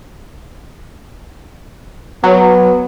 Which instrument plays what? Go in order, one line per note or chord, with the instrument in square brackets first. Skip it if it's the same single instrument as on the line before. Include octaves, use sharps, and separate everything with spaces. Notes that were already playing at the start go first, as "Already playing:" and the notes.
[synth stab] F#3 [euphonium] B3